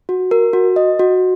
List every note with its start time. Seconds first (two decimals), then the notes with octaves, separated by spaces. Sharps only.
0.09 F#4
0.31 A#4
0.53 F#4
0.76 D#5
0.99 F#4